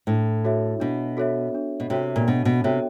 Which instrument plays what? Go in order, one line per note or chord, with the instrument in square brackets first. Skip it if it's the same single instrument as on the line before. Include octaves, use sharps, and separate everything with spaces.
[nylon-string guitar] A2 [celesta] D4
[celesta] F#4 A4 C#5 E5
[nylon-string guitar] B2 [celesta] D4
[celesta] F#4 A4 C#5 E5
D4
[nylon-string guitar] B2
[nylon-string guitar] C3 [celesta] F#4 A4 C#5 E5
[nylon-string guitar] A#2
[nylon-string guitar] B2 [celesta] D4
[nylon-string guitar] B2
[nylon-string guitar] C3 [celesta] F#4 A4 C#5 E5